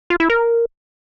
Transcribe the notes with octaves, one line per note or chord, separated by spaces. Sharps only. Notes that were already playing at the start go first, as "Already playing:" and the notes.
F4
E4
A#4